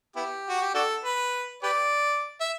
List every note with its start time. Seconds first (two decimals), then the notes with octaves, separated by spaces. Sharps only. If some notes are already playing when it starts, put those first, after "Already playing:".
0.16 B3 E4 G4
0.49 F#4
0.61 G4
0.75 D4 F#4 A4
1.04 B4
1.63 G4 B4 D5
2.40 E5